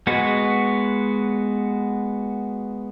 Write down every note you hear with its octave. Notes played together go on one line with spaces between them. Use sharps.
G#3 B3 F#4